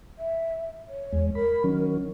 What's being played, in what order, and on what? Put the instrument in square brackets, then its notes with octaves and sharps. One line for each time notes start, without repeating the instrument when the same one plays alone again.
[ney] E5
C#5
[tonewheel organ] E2 G#3
[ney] A#4 [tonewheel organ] B5
[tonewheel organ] D#3 F#3 C#4